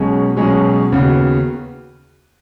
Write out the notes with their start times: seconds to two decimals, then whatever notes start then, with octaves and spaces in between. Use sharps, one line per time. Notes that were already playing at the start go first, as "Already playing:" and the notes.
Already playing: B1 B2 G#3 C#4 G#4
0.36 B1 B2 G#3 C#4 G#4
0.92 D#2 C#3 B3 F#4